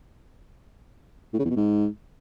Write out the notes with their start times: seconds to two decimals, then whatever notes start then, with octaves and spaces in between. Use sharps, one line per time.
1.33 A2
1.39 C#3
1.45 E2
1.50 B2
1.56 G#2